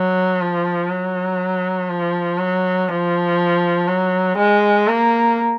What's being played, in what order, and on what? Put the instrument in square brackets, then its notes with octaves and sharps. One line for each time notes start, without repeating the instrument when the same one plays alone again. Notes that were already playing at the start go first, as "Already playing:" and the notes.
Already playing: [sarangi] F#3
F3
F#3
F3
F#3
F3
F#3
G#3
A#3